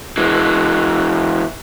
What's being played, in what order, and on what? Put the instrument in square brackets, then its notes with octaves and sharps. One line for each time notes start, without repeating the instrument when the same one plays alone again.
[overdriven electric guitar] E3 G#3